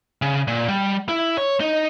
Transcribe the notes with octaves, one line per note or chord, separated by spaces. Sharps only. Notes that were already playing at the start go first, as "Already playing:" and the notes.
C#3
A#2
G3
E4
C#5
D#4